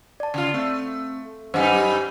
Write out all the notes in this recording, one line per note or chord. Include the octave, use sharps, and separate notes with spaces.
D5 A5
C#3 F4
A3 C4
F#2 G3 D#4 C5 D#5 G#5